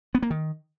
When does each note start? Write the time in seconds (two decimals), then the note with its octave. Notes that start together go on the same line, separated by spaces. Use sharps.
0.15 B3
0.23 A#3
0.30 D#3